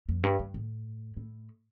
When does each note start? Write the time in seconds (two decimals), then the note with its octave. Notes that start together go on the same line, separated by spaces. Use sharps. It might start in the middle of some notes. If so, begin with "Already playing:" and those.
0.09 F2
0.23 G2
0.39 G2
0.54 A2
1.17 A2